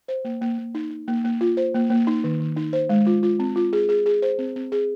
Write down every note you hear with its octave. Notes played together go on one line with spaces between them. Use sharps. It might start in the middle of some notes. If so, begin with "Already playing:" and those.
C5
A#3
A#3
A#3
D#4
D#4
A#3
A#3
F4
C5
A#3
A#3
D#4
D#3
D#3
D#4
C5
G#3
F4
F4
C4
F4
G#4
G#4
G#4
C5
C4
C4
G#4